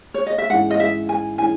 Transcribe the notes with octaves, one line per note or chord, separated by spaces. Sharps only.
C#5
D#5
E5
G#2 E3 G#3 C#4 F#5
D#5
E5
G#5
E3 G#3 C#4 G#5